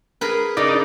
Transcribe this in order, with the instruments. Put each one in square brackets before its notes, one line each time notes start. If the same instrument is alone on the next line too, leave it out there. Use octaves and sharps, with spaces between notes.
[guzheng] G#4 A#4 B4
[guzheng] C#3 [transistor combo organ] D#4 D5